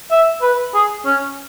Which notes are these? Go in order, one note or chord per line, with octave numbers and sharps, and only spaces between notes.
E5
B4
G#4
C#4